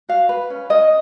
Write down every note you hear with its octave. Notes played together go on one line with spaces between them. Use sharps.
F#4 F5
B4
C#4
C#4 D#5